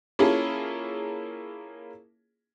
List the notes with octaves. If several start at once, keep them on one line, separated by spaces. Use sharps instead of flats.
A#3 C#4 E4 F4 G#4 A4